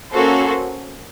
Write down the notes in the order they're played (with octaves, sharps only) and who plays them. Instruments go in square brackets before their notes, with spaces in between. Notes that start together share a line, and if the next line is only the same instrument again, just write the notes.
[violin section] A#3 C#4 F#4 A4 C5